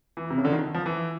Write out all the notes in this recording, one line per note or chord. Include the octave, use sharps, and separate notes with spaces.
E3
C3
C#3
D3
D#3
F3
E3